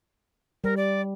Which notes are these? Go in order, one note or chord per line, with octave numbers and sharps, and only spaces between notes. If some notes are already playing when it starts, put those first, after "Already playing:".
G3 A#4
D5